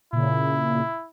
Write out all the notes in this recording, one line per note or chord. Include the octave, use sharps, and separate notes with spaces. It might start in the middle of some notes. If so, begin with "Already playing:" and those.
A#2 C#3 E4